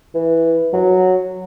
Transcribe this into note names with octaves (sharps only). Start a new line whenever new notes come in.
E3
F#3